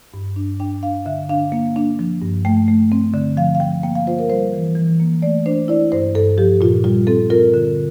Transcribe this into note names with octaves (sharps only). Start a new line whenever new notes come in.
G2
D4
D4 G5
D4 F5
D3 E5
D4 F5
A#3
D4
F3
G2
A3 G5
A3
C4
D3
F3 F5
F5
F3 G5
A#3 G5
F5
F4 C5
A#4
G3 C5
E3
E3
A#3
A3 D5
D4 C5
E4 D5
G2 C5
G2 A4
F3 G4
A#2 F4
G3 F4
C4 A4
F4 A#4
D3